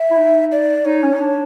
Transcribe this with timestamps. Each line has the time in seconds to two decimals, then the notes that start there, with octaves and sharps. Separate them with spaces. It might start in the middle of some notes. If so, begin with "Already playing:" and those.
Already playing: E5
0.11 E4
0.17 D#4
0.52 D5
0.85 D#4 C#5
1.03 C#4
1.13 D#4
1.20 D4